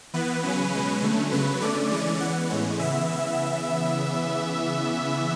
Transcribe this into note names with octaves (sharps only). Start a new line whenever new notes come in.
E3 B3 B4
C#3 F#3 C#4
B2 G#3 C#4
D3 F#3 A3 C#4
C#3 F#3 B3 B4
D3 A3 C#4 D5
E3 G#3 C#4
E3 B3 F#5
A2 E3 G#3 C#4
C#3 E3 B3 E5